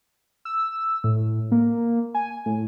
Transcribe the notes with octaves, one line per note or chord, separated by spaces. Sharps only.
E6
A2
A#3
G#5
A2